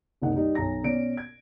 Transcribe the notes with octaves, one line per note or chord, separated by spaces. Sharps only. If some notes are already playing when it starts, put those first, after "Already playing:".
F#1 C2 C4 D#4 F#5
G3 D#4
B1 A#5 A#6
B2 C#4 D5 D7
G#6